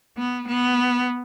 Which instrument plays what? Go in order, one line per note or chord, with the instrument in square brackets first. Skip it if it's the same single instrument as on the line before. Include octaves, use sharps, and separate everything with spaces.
[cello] B3
B3